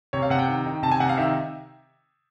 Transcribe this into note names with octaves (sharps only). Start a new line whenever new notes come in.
C3 C#5
F5
C3 F#5
G5
D#3
D#3
C3 A5
G#5
C3 F#5
F5
D#3 E5